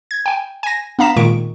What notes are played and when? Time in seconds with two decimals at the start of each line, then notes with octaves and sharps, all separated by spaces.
0.11 G#6
0.26 G5 G#5
0.63 G#5 A#6
0.99 B3 D4 F5 A#5 B6 E7
1.16 A#2 D#3 G#3 C#6 D7